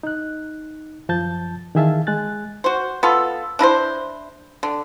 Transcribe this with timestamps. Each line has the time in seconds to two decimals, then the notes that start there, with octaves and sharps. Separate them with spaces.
0.03 D#4 F#6
1.09 F#2 F3 A5 G6 A6
1.75 D#3 E3 G#4 E5 F5 A5
2.07 G#3 G#5 F#6 A6
2.64 F#4 C5
3.03 B3 F4 A4
3.59 D4 E4 A#4 C5
4.63 D3